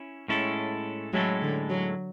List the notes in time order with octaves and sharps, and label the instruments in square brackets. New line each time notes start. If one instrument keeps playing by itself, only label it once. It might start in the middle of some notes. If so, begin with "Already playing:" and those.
Already playing: [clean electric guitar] C#4 E4
A2 G#3 C#4 E4 A4
[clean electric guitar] A2 G#3 C#4 E4 A4 [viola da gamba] F#3
[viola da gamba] D3
F#3